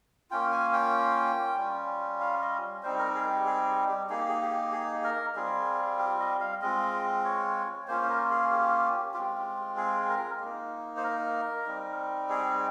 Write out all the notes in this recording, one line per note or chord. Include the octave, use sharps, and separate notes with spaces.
A#3 C#4 F4 G5
G#5
G5
G3 C#4 F4
F5
D#5
G3 C4 D#4 C5
A#4
G#4
G4
G#4
G4
A#3 D#4 G#4
G4
G#4
G4
G#4
A#4
G3 C4 F4 G#4
G4
D#5
F5
G#3 C4 F4 D#5
C#5
A#3 C#4 F4 C5
C5
A#4
G#4
G4
G#3 C4 F4 G4
G#4
A#4
A#3 D#4
C5
A#4
G3 C4 D#4
G#4